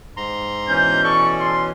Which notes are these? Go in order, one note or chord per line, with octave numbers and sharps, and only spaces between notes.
G#2 A#5 C6
B2 E3 C#4 G6
A4 D5 C#6
C6